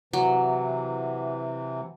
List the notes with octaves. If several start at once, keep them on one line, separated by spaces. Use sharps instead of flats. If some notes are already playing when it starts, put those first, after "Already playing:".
C3 E3 F#3